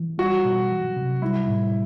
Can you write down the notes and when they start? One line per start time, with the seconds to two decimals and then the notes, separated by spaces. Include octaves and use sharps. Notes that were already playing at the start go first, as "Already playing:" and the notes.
Already playing: E3
0.18 G3 F#4
0.45 B2
0.70 F#3
0.96 C3
1.22 G3 E4
1.48 A2